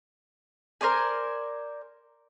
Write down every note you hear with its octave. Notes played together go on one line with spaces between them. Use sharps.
A#4 C5 D5 G#5